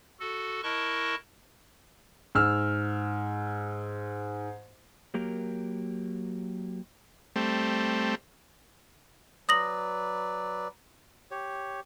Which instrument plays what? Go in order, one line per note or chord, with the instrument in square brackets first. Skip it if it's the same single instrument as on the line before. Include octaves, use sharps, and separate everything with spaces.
[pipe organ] F#4 A4
E4 A#4 D#5 A5 C#6 F#6
[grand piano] G#2 E6 F6
[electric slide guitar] F#3 A#3 G4 A#4
[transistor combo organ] G3 A3 C4
[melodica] F#3 B4 D5 [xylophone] D#6 A#6 F#7
[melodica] G4 C#5